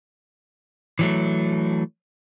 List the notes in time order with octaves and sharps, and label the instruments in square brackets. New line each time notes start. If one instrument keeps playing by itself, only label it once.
[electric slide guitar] E3 F#3 A3